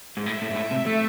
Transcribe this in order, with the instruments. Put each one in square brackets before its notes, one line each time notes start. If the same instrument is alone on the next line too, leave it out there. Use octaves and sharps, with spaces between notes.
[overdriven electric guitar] G#2
[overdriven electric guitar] A2 [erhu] E5
[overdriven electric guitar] A2
G#2
A2
C3
A3